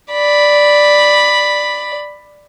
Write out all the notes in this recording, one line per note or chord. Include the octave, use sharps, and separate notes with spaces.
D5 B5